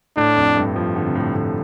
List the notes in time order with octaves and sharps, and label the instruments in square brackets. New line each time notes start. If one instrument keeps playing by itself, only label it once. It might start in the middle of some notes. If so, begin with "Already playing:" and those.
[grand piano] A2 [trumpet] D4
[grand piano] F2
G2
F3
D3
C3
A2
A2